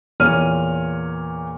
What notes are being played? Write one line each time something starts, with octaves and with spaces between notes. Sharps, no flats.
E2 A#2 C#5 F6 D#7